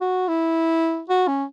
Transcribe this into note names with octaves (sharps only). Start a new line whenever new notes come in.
F#4
E4
F#4
C#4